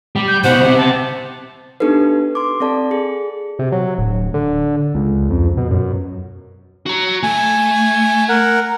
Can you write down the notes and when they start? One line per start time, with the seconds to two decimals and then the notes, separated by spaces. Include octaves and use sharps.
0.16 G3
0.28 G6
0.44 C2 B2 C5 F#5
0.64 C3
0.77 A5
1.80 B3 D4 D#4 G4 A4 B4
2.35 C6 D6
2.60 C4 A4 D5 A5
2.91 G#4
3.59 C3
3.72 F#3
3.98 D1
4.34 D3
4.95 C#2
5.30 F2
5.57 B2
5.71 F#2
6.86 F#4 A#5
7.23 A3 G#5
8.29 A#4 F#5